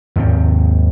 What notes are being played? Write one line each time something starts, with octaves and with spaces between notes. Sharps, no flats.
D#2 G#2 C3 C4